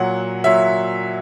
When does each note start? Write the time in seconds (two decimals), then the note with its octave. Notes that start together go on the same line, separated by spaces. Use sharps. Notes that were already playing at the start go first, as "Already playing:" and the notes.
Already playing: A#2 F#3 F#5
0.44 A#2 F#3 E5